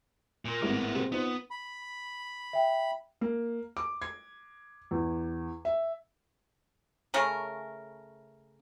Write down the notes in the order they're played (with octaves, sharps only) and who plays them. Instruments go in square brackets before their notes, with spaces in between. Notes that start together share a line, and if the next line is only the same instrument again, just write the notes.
[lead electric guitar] A#2 A#3
[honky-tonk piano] G#1 A2 G#3 [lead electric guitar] A#3 B3
[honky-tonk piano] B2 C4 G#4
[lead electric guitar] B3 [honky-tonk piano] D#4 F4 C5
[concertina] B5
[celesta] E5 G5
[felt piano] A#3
D6
G#6
E2
E5
[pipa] C#3 A3 C#4 A#4